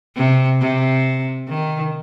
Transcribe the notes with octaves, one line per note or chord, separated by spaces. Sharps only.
C3
C3
D#3